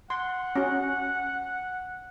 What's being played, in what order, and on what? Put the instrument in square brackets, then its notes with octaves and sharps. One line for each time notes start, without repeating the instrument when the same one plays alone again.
[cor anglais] F#5 [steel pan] C6
[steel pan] C#4 F#4